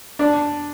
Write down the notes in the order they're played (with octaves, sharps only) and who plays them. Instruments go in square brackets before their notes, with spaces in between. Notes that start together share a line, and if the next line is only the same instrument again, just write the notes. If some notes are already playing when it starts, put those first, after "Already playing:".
[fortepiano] D4